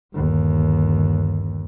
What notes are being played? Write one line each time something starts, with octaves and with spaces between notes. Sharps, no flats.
G1 D#2